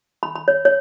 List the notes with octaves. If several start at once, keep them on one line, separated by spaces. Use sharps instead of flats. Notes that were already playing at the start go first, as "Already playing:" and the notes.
B5
B5
C#5
C#5